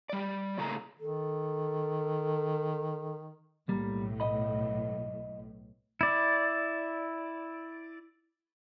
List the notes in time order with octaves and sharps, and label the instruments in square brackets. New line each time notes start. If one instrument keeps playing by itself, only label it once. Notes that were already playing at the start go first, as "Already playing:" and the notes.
[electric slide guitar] G3 D5
A2 C#3 A3 A#3 G#4 A#5
[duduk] D#3 [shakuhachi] A4
[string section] B1 A2 [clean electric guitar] G3 A#3
[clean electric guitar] D#5 B5
[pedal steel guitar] E4 D5